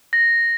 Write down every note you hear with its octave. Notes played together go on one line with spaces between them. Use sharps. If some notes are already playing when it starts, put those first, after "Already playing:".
A#6